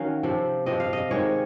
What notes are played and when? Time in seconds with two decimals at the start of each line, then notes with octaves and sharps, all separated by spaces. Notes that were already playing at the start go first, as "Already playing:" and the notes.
Already playing: D#3 F#3 C#4 F5
0.23 C3 F3 C4
0.66 C3 F3 C4 D#5
0.80 F5
0.93 D#5
1.11 C3 D#3 G#3 C#5